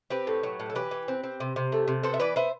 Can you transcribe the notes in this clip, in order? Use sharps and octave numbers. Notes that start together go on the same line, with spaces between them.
C4 G4 B4
A2
F#3
A2
A4
E3 G4 B4
E3
C4
C4
C3
C3
A3
C3
B3 A4 C5
E5
E3 B4 D5
B3 C5 E5